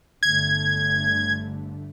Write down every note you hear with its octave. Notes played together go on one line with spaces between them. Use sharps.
G1 D3 A3 G#6